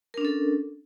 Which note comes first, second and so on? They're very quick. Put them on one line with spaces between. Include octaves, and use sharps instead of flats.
A#4 D4 C#4 A4